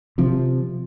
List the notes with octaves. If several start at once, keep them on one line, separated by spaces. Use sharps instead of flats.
C3 F3